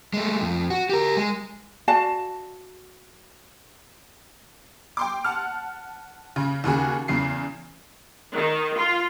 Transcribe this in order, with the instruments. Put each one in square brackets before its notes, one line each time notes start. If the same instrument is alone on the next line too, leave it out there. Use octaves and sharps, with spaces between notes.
[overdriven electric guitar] G#3 A3
F2
F#4
G4 A#4
G#3
[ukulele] F#4 D5 F5 A5
[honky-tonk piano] G5 C6 D6
F#5 A5 F6
C#3
D#2 C#3 F#4 G#4
E2 C#3 C7
[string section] D#3
F4